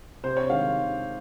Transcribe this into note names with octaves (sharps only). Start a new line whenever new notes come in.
C3 C5
C#5
D#3 G#3 F5